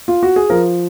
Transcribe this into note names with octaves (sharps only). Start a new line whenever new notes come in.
F4
F#4
G#4
F3 A#4